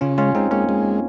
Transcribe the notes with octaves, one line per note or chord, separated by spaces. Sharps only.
C#3 C#4 F4
G#3 C#4 F4
G#3 C4 D#4
G#3 A#3 C#4
G#3